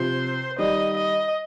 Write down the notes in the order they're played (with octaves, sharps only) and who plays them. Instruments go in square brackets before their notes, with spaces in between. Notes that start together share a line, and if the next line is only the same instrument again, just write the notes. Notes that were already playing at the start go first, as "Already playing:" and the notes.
Already playing: [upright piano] C3 F3 [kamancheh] C5
[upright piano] D#3 G3 [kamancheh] D#5
[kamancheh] D#5